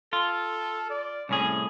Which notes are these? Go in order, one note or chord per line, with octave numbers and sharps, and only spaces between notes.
F4 A4
D5
C2 A2 C#4 G#4